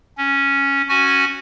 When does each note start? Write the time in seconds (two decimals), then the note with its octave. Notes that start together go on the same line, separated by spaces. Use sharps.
0.18 C#4
0.89 C#4 F#4 G#5